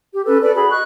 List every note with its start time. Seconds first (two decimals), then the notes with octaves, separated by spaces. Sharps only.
0.14 G4
0.26 C#4 A4 B4
0.42 A4 B4 D5
0.56 F#4 G#4 B5
0.71 D#5 C#6 F#6